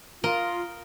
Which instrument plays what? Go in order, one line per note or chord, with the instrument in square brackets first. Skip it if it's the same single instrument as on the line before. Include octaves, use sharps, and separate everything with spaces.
[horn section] F4 [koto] A#4 D#5